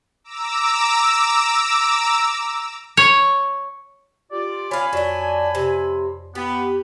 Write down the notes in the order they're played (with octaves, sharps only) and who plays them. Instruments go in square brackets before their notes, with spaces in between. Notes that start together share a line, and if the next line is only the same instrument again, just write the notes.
[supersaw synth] A#5 D6 E6
[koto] C#5
[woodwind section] F4 G4 D5
[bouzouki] C#4 F5 [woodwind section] G#5 B5
[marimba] F2 C#5 D5 [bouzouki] F#3 D4
[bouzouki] C3
[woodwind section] B3 [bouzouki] G4